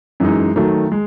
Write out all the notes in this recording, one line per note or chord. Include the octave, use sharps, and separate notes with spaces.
F#2 E3 G#3 D#4
D#3 F#3 A3
G#3